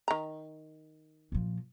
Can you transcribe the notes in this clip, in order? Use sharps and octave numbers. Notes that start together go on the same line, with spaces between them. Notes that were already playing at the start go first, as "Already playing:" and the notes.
D#3 A#5
A#2 F3